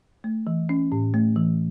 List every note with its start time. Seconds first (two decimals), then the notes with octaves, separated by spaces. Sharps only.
0.24 A3
0.47 E3
0.69 C#4
0.92 A2
1.14 A3
1.36 E3